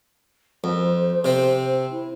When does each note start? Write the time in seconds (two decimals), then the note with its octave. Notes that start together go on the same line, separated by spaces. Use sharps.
0.64 F2 C5
1.24 C3 C4
1.91 E4